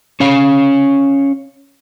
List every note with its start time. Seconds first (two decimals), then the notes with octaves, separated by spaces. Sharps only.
0.20 C#4 C#5 F5